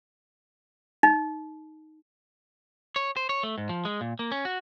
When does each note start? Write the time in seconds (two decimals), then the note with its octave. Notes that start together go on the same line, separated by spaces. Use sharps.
1.03 D#4
2.96 C#5
3.17 C5
3.29 C#5
3.43 A3
3.58 G#2
3.69 F3
3.85 G#3
4.01 A#2
4.19 A#3
4.32 C#4
4.45 F#4